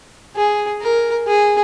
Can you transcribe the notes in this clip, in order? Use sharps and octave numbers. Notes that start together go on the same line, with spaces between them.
G#4
A#4
G#4